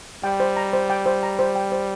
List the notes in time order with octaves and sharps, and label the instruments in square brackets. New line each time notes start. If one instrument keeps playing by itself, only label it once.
[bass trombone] G3 [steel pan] G5
[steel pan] C5
A#5
C5
G5
C5
A#5
C5
G5
C5